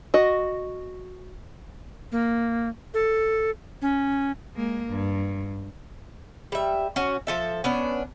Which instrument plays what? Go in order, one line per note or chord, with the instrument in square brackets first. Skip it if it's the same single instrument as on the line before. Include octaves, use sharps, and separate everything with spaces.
[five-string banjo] F#4 D#5
[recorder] A#3
A4
C#4
[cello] G#3 A#3
G2
[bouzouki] G3 E5
C#4 F#4
F3 A4 E5
B3 C#4 D4